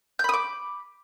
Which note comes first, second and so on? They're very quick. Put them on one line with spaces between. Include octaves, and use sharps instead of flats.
G6 B5 D#6 D6